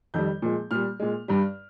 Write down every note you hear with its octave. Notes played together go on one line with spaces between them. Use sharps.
F2 D#3 G3 G6
A#2 F3 G#3
A#2 G3 F6
A#2 G#3
G2 G3